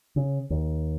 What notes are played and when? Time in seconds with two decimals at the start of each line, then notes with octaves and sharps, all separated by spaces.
0.16 C#3
0.50 D#2